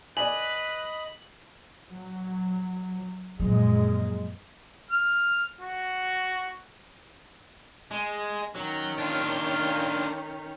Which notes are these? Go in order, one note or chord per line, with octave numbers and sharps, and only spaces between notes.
B4 D5 D#5 G#5 B5 F#7
F#3
F#2 A#2 F3 F#3 G#3
F6
F#4
G#3
D#3 F#3 C#4
D4 F4